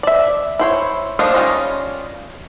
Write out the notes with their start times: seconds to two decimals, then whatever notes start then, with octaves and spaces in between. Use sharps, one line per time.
0.03 D5 E5
0.59 E4 C5 C#5
1.19 F3 A#3 D4 D#4 F4
1.34 G3 C#4 D#4 F4